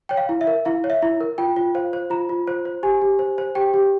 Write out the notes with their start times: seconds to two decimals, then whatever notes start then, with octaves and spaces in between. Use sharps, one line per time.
0.09 C#5 G5
0.17 F5
0.29 E4
0.41 E5
0.47 A#4
0.65 E4 F5
0.84 C#5
0.90 E5
1.02 E4
1.21 A#4
1.38 F4 G5
1.56 F4
1.75 C5 F5
1.93 C5
2.10 F4 A#5
2.29 F4
2.47 C5
2.65 C5
2.83 G4 G#5
3.02 G4
3.19 C5
3.38 C5
3.55 G4 G5
3.74 G4